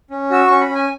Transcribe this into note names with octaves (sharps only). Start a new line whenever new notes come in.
C#4
F#4 E6
C#4 C#6
B5
C#4
G#5